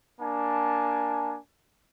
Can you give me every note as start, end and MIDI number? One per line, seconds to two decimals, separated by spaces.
0.21 1.38 58
0.21 1.38 62
0.21 1.38 80
0.21 1.38 81